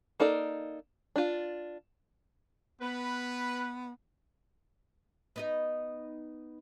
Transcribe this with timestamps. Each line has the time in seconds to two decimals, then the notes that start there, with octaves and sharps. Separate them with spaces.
0.20 A#3 D#4 A4 D5
1.16 D4 F4
2.81 B3 B4
5.36 B3 D#4 D#5